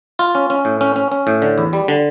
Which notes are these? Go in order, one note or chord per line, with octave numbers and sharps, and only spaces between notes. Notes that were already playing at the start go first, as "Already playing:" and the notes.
F4
C#4
C#4
A2
C#4
C#4
C#4
A2
D3
E2
G3
D3